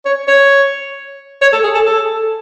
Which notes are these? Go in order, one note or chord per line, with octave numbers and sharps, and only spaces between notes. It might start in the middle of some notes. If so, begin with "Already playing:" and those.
C#5
C#5
C#5
A4
G#4
A4
A4